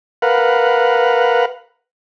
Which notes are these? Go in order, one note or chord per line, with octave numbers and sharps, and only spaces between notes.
A#4 B4 F5 F#5